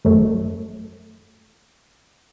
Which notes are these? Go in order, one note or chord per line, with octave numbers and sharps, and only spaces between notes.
G#1 F#2 A3